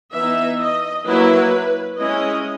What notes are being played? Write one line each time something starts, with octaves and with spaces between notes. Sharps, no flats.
E3 B3 D#4 E5
D#5
F#3 A#3 E4 B4
G#3 C#4 E4 D#5